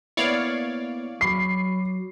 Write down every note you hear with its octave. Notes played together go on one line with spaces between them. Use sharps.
A#3 B3 E4 C#5 D5 F5
F#3 B5 C#6 D6 C7